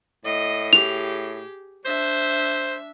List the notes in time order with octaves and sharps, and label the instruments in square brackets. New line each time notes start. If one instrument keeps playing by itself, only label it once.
[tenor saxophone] A2 [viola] D#5
[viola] G4 G#4 [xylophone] F7
[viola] D4 E5 [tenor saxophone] C5